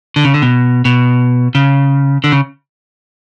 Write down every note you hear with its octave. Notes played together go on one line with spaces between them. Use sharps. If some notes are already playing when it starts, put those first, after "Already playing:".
D3
C#3
D3
B2
B2
C#3
D3
C#3